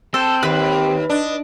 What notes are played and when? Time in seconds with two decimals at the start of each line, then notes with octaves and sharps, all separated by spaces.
0.14 C4 A4 G6
0.43 D#2 G4 B4 F#6
1.09 D4 D#5